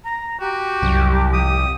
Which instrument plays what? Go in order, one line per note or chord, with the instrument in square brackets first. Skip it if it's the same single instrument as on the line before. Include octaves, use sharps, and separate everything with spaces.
[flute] A#5
[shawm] F#4 [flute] G4
[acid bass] C2 [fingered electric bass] F#2 F#3
[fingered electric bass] F3 [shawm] D#6